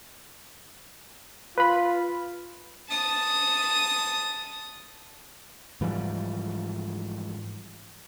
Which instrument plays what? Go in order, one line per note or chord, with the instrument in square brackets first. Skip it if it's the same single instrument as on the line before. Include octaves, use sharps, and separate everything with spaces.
[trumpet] F4 [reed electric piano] B4 B5
[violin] A5 D#6
[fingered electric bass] G#2 E3 F3 G3